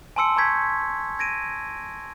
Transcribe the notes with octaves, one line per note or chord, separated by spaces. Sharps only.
G#5 A5 C6 E6 C#7
A#5 C#6 G6 G#6 B6
G#6 A#6 D7 D#7